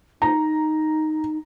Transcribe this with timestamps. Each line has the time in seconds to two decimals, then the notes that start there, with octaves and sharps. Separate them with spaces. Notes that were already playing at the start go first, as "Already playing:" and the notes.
0.22 D#4 A#5